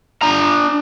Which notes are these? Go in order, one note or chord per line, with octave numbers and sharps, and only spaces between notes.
D4 A#5